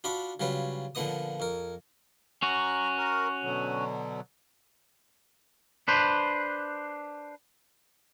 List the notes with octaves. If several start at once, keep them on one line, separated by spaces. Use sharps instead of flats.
D4 F4 F#4 B5 D6
C#3 F#3 G3 F4 B4
A#2 D3 F3 B3 D#5 D#6
F2 A#4
C#4 F#4 A#5
A#4
B2 D3 F#3
D4 B4 C5